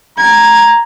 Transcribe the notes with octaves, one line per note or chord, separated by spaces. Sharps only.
A#5 G#6